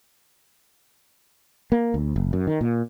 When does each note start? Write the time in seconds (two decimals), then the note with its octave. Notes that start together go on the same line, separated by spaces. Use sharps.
1.72 A#3
1.94 D2
2.16 F#1
2.33 F#2
2.47 D#3
2.61 A#2